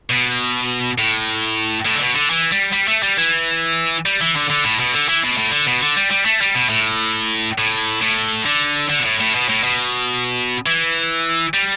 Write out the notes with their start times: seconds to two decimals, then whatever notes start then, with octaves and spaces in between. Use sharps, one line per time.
0.10 B2
0.98 A2
1.85 A2
1.95 D3
2.00 B2
2.14 D3
2.30 E3
2.52 G3
2.73 G3
2.88 A3
3.03 G3
3.17 E3
4.06 G3
4.21 E3
4.36 D3
4.50 D3
4.64 A2
4.80 B2
4.93 D3
5.09 E3
5.24 B2
5.37 A2
5.52 D3
5.67 B2
5.81 D3
5.96 G3
6.11 G3
6.25 A3
6.41 G3
6.55 B2
6.70 A2
7.58 A2
8.01 A2
8.46 D3
8.90 D3
8.99 B2
9.04 A2
9.20 A2
9.35 B2
9.49 A2
9.63 B2
10.66 E3
11.54 G3